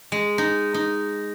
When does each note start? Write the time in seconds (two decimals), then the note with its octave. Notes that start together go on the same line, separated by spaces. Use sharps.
0.12 G#3
0.38 D#4
0.74 D#4